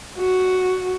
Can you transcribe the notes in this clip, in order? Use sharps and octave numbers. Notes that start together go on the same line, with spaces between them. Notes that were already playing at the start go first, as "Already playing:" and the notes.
F#4